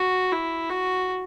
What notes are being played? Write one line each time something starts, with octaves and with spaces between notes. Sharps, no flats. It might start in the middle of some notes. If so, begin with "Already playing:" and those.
Already playing: F#4
E4
F#4